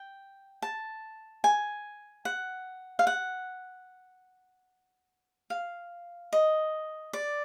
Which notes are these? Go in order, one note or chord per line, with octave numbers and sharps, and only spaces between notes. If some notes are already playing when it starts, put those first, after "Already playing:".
Already playing: G5
A5
G#5
F#5
F5
F#5
F5
D#5
D5